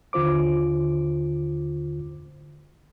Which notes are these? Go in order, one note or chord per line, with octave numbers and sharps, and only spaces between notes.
D#2 D3 F4 C5 D6